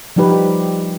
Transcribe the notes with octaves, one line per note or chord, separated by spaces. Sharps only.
F3 G3 D#4 G4 B4